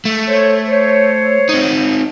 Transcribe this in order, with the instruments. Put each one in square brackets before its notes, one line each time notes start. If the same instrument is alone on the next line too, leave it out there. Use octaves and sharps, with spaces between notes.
[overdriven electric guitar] A3
[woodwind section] A4 C5 C#5
C5 C#5
[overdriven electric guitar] C4 D#4